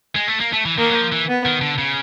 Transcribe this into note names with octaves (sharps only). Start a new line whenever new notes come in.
G#3
A3
A#3
A3
E3
D#3 A#3
F#3
F3
E3
B3
D#3
D3
C#3